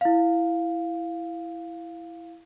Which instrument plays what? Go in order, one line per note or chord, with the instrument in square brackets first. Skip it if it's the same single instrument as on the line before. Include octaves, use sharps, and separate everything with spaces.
[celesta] E4 F5